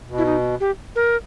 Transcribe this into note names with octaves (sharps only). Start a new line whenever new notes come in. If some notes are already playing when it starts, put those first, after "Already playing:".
B2
E4
D#4
G4
A#4